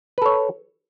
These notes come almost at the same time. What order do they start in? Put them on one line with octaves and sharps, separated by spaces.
B4 A4 C#5